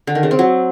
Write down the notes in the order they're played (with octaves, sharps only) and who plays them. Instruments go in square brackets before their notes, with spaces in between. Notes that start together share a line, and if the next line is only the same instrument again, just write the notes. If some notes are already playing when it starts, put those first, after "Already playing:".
[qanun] D3
D#3
C#3
C4
F#3